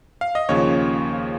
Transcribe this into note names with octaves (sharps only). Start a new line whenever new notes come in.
F5
D#5
D#2 C#3 F3 C#5